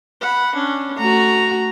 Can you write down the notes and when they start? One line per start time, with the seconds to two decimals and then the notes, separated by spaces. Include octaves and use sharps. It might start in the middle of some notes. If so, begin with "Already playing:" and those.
0.21 F#5 B5
0.55 C#4 D4
0.98 A3 F#4 A#5